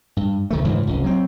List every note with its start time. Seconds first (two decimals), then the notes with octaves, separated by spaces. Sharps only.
0.17 G2
0.51 C2 D#3 A3
0.65 C#2 G#2 E3 F3
0.87 F1 C#2
1.04 F#3 C4